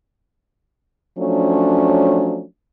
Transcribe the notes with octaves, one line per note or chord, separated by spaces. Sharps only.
F3 F#3 A3 C#4 D4